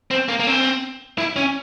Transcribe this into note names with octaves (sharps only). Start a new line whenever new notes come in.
C4
A#3
A#3
C4
E4
C#4